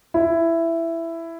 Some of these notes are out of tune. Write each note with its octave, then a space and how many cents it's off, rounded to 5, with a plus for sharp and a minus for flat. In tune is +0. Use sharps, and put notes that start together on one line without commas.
E4 +10